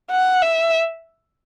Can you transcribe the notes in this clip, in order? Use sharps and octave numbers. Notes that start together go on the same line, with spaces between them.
F#5
E5